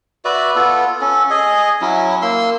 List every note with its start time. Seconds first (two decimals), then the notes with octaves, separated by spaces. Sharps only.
0.25 F#4 B4 D5 E5
0.55 B3 F4 A4
1.01 C#4 A4
1.30 G#4 D#5
1.81 F#3 C#4 E4
2.22 A#3 C6 E6